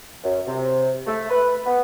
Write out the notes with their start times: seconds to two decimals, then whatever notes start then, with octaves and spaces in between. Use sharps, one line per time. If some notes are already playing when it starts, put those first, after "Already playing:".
0.24 F#2
0.47 C3
1.07 A3
1.30 B4
1.66 B3